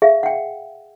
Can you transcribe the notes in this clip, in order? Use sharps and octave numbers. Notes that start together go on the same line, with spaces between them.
G#4 E5 F5
F#5 G5